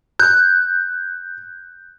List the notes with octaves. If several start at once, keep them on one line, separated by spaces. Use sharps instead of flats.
F#6 G6